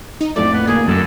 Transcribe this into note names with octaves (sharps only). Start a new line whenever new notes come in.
D#4
A#1 F2 A2 A3 D5
B3
D2 A#3 G#4
F#2 A4